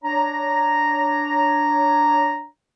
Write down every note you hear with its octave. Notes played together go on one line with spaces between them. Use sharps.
D4 C#5 A#5